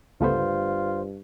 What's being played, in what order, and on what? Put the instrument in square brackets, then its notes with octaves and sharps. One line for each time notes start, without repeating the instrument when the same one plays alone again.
[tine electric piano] G1 C5 [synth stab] C#2 A3 B3 [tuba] G2 [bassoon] F4